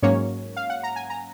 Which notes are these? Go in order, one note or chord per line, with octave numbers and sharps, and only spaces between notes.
G#2 F#3 A#3 C#4 C#5
F5
F#5
A#5
G#5
A#5